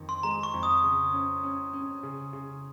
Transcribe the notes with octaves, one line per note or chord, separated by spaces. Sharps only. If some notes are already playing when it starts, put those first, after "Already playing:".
Already playing: F2 D#3
C6
G#3 A#5
C#6
F2
D#6
C#3
C#4
C#4
C#4
C#3
C#3